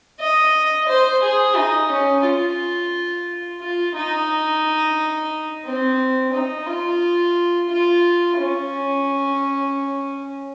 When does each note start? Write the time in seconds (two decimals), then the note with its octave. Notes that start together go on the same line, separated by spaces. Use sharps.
0.20 D#5
0.88 C5
1.23 G#4
1.56 D#4
1.91 C#4
2.25 F4
3.60 F4
3.95 D#4
5.65 C4
6.33 D#4
6.67 F4
7.70 F4
8.38 C#4